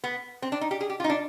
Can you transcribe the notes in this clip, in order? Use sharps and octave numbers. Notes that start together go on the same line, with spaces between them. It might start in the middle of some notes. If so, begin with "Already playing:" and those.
B3
C4
D4
D#4
G4
G#4
G4
F4
D#4
D4